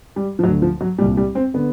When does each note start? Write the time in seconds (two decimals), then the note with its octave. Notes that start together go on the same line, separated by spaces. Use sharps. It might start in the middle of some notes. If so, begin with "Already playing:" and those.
0.16 G3
0.39 F3
0.43 D2 D3 F#3
0.62 F3
0.81 F#3
0.98 A#2 G3
1.02 C2
1.17 G3
1.35 C4
1.54 D3 B3